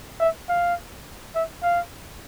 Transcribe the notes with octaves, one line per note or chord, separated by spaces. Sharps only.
E5
F5
E5
F5